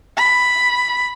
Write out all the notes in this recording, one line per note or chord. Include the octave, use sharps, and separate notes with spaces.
B5